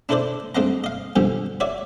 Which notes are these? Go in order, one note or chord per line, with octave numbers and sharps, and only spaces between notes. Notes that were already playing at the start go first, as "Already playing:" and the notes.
D4 E4 A4 B4 C5 D5
G2 A3 C4 D#5 F#5 A#5
D#5 F5
G2 B2 D3 F3 G3
F#4 C#5 D5 E5